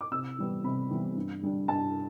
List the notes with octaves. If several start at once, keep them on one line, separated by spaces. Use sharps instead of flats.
D6
C3 E6
E3 G3 B3
C3 B5
E3 G3 B3
G2
D3 G3 D4
G2 A5